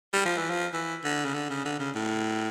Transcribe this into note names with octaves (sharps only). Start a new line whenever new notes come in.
G3
F3
E3
F3
E3
D3
C#3
D3
C#3
D3
C#3
A2